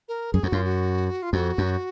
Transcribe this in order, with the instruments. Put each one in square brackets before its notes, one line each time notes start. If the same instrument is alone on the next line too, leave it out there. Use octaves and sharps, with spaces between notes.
[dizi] A#4
[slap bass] F#2 [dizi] G#4
[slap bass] F2 [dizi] F#4
[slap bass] F#2 [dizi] F4
[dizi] F#4
F4
[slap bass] F2 [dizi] F#4
[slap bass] F#2